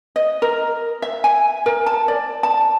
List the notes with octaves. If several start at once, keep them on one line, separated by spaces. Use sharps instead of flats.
D#5
A#4
E5
G#5
A#4
A5
D5
A5